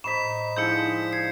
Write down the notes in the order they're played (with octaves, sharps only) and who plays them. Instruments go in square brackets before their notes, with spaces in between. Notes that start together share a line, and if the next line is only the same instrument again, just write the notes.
[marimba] A2 C5 [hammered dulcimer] D#4 D#5 B5 [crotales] B6 E7
[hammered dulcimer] D3 F3 G#3 [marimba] D#4 E4 [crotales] G6 C#7
[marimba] D#4
[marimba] G#6 [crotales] C7